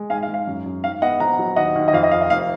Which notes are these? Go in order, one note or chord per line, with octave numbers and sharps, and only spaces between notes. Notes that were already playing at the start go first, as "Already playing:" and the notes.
Already playing: G#3
G#2 F5 G#5
F5
G#2
F5
F#2
F#2
G#2 F5
B3 D#5 F#5
A#1 F#5 A#5
F#3
D#2 D#5 F#5
D#2
D#5
F2 F5
D#5
F2 F5
D#5
F1 F5